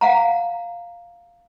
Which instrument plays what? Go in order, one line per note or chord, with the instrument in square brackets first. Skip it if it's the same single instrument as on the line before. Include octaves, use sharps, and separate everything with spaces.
[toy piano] F5 F#5 A#5